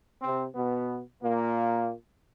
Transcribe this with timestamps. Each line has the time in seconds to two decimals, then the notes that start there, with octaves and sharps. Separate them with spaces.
0.22 C3 C4
0.55 B2 B3
1.22 A#2 A#3